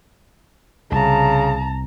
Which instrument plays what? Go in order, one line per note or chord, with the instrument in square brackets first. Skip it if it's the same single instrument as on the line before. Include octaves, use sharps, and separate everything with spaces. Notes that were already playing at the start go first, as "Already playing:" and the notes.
[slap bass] C2 [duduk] C#3 [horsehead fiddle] A5 A#5